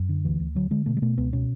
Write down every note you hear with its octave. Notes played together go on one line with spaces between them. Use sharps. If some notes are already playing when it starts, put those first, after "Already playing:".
Already playing: F#2
D3
D2 E3
D2
D3 F#3
D3 G#3
B2 A3
G#3
B2 A3
C#2 B3
B2 C#4